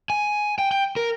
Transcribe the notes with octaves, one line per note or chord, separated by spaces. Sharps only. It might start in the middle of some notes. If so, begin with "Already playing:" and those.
G#5
G5
G5
A#4